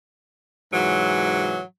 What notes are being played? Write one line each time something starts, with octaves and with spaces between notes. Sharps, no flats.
G#2 C3 E3 F#3